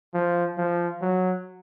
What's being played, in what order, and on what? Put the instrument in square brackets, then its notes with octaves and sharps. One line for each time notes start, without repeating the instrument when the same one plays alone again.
[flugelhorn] F3
F3
F#3